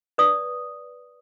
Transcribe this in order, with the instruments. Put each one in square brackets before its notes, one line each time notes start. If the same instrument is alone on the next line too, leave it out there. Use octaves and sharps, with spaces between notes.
[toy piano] B4 D5 D#6